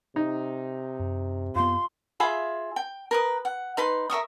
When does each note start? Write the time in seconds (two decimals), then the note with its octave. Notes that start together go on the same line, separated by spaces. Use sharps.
0.16 C3 D#4
0.99 F#2
1.55 F#2 B3 F4 C6
2.20 F4 G#4 E5 B5
2.76 G5
3.11 A#4 B4 D#6
3.45 F#5
3.77 D#4 B4 B5 C6
4.10 A#4 E5 C#6 D#6